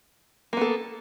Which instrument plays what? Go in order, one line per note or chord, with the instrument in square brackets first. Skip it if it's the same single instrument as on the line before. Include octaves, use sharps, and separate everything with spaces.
[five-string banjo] A#3
B3
A4